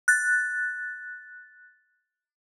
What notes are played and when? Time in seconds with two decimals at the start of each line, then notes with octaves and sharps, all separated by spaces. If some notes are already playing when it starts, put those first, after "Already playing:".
0.08 F#6 A6